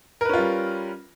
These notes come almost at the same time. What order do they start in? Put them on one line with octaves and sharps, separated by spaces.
A#4 B4 C#4 F4 G3